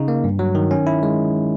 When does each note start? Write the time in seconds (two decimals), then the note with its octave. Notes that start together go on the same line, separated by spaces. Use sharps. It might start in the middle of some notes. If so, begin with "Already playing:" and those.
Already playing: C#3 D#4
0.08 A#3
0.24 G2
0.39 F#3
0.55 D#3
0.71 C#4
0.87 E4
1.03 G#3